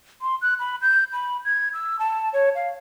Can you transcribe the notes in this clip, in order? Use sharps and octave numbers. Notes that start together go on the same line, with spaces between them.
C6
F#6
B5
G6
B5
G#6
E6
A5
C#5
F5